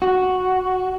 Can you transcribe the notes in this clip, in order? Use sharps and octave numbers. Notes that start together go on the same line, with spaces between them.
F#4